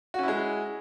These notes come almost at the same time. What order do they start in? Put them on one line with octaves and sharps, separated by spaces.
F#4 C#4 E4 G#3